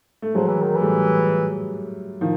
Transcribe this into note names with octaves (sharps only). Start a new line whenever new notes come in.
A3
F3 F#3 G#3
E3
D#3
E3
G3 A3
D#3 F3